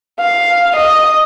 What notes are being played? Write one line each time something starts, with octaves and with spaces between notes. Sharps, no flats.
F5
D#5